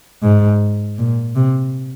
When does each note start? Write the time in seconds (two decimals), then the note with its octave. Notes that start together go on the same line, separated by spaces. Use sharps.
0.23 G#2
0.98 A#2
1.35 C3